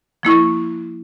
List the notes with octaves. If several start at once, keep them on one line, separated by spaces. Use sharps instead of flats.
F3 A#3 E4 C#6